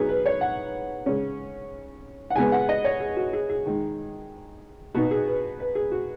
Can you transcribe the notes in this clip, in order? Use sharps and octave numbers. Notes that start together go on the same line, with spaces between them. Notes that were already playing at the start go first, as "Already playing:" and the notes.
Already playing: F#3 B3 D#4 G#4
B4
C#5
F#5
C#3 G#3 C#4
F#5
C#3 G#3 B3 G#5
F#5
D#5
C#5
G#4
F#4
G#4
G#4
D#3 G#3 D#4
B2 B3 D#4 F#4
G#4
B4
B4
G#4
F#4